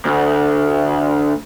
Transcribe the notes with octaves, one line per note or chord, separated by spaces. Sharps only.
D2